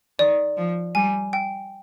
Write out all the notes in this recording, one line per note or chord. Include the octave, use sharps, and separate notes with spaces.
D#3 D5
F3
G3 G#5
G5